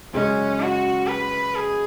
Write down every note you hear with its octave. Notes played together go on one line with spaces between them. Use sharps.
F#2 C#3 G#3 C#4
F#4
B4
G#4